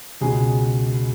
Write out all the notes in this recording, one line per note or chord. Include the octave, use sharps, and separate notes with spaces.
C#2 B2 G#3 G#4